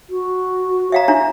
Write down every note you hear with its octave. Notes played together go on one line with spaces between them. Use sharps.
F#4
C#5 E5 F5 A#5
D4 E4 A#5